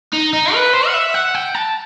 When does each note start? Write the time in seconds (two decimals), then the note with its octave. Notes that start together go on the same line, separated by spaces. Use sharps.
0.13 D#4
0.33 D#4
0.54 B4
0.73 C5
0.87 F#5
0.94 E5
1.14 F#5
1.35 G5
1.55 A5